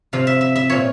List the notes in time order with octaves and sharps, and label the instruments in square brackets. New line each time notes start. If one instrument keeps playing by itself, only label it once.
[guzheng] C3 F3 F5
E5
E5
E5
A#2 F3 C#5